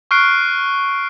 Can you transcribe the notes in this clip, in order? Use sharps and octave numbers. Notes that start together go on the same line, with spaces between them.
C#6 F6 F#6 C7 D7